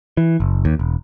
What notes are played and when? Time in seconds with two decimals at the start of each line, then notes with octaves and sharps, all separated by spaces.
0.17 E3
0.40 F#1
0.65 D#2
0.79 E1